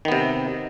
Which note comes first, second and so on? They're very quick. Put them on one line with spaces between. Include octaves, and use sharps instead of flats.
D#3 B3 C3